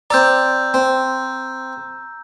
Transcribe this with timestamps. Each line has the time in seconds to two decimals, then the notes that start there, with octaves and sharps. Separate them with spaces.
0.10 C4 D5 A#5 E6 G6
0.74 C4